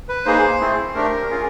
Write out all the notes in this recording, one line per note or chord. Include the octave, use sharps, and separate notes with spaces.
B4
A#3 D#4 G#4 C5
A3 C4 E4 G#4
A3 D4 G4 A#4
C#4 F4 G#4